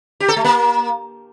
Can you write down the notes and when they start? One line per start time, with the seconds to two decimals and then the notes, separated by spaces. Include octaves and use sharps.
0.20 G4
0.28 A4
0.36 A3
0.44 A#3